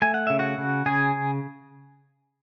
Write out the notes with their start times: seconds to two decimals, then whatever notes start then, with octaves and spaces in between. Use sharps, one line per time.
0.02 A3 G#5
0.14 F#5
0.27 C#3 E5
0.39 F#4 F#5
0.58 C#3
0.86 C#3 G#4 G#5